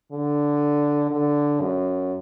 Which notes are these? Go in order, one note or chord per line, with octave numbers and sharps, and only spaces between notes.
D3
D3
F#2